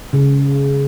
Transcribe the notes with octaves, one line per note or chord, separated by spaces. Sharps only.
C#3